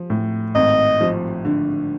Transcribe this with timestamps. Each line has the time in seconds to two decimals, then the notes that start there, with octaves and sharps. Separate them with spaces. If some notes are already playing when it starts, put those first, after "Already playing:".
Already playing: F3
0.10 A2
0.55 G#1 D#5
1.01 F3
1.45 D3